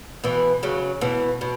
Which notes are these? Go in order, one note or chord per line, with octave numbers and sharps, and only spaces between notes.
B2 E3
C#3 F#3
B2 E3
B2